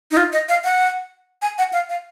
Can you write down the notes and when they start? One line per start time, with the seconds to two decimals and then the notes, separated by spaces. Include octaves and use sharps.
0.11 D#4
0.17 F4
0.33 D#5
0.49 F5
0.64 F#5
1.42 G#5
1.58 F#5
1.73 F5
1.89 F5